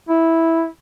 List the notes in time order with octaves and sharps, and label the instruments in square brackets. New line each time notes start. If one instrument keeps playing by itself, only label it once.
[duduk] E4